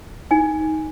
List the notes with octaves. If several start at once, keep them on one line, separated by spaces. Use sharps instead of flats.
D#4 G#5